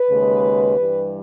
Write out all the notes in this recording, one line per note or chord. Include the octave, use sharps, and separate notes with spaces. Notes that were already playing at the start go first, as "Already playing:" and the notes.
Already playing: B4
D#2 C#3 G#3
G2 E3 G3